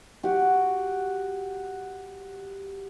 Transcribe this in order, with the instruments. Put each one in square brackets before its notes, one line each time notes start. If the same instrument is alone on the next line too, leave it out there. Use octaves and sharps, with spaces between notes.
[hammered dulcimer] F#4 G4